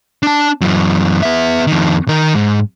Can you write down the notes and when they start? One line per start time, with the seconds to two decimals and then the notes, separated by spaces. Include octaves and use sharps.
0.23 D4 A5
0.61 F#2 E3
1.22 B3 E5
1.67 F2 D#3
2.08 D#3 A#4
2.35 G#2